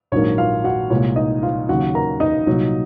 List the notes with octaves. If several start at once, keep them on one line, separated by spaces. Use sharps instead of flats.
A#1 G#2 D#3 F#3 A#3 C#5
F4 F5
F#4 F#5
C2 A#2 G#3 C#5
D#4 D#5
F4 F5
D#2 C#3 F#3 F#4 F#5
A#4 A#5
D#4 D#5
C2 A#2 F#3